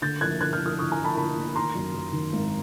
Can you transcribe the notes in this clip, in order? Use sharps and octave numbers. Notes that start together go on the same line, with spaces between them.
D3 G6 A6
F3 F#6 G#6
D3 F#6 G#6
F6 G6
F3
D#6 F6
D3 C#6 D#6
G#5 A#5
F3
A5 B5
D3 A5 B5
A#3
D#3 A#5 C6
F#2
F#2
D#3
G#1